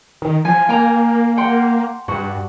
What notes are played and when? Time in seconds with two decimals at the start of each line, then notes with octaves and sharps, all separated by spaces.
0.22 D#3
0.45 F3 G#5
0.69 A#3 G5 G#5 A#5
1.37 F#5 G5 C6
2.08 G2 F#4